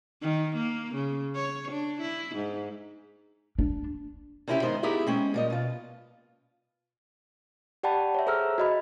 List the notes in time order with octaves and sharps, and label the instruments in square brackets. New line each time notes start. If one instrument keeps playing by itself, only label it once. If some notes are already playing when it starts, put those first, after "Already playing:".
[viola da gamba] D#3
A#3
C#3
C#5
D4
E4
G#2
[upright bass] D4
[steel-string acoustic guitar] C3 C4 C#4 E4 F#4 G4
G#2 D#3 B3 D#4 C5
B3 D#4 E4 G4 G#4 E5
G#3 C4 C#4
A#2 G3 D#5
B2 F4
[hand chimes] G4 D5 F#5 G5 A5 B5
C#5 E5
G#4 A4 C5 A#5 E6 F6
F#4 D#5 B5